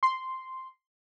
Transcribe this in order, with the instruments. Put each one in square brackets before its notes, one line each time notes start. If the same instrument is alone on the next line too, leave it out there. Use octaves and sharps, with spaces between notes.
[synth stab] C6